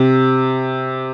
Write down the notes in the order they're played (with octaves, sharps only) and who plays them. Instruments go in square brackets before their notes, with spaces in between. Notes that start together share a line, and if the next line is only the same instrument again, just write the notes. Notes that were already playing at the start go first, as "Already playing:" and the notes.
Already playing: [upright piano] C3